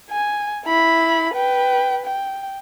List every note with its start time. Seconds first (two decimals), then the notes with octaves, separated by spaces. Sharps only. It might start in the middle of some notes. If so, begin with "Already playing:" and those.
0.11 G#5
0.65 E4 B5
1.34 B4 G5
2.06 G5